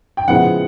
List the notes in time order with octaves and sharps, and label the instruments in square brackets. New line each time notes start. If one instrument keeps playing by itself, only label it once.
[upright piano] G5
C#3 F3 G#3 B3 E4 F#5